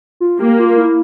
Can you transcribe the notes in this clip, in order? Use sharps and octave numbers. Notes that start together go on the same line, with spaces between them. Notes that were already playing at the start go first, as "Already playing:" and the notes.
F4
A#3 G4
F4
E4